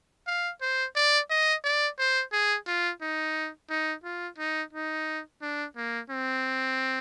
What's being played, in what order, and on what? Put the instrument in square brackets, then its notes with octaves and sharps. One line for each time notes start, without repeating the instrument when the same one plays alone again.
[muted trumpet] F5
C5
D5
D#5
D5
C5
G#4
F4
D#4
D#4
F4
D#4
D#4
D4
A#3
C4